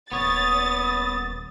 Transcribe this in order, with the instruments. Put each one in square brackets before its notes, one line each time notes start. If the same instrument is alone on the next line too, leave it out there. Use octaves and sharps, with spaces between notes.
[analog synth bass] D#1 [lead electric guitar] B3 C#5 [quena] D#6 [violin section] A6